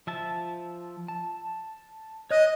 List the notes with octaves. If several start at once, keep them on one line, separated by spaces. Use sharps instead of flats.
F3 E5 A5
A5
C#5 D#5 F#6